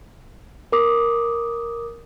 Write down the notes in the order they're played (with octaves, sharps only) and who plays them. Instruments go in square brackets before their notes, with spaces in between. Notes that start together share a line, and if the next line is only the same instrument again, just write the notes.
[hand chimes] A#4 D6 D#6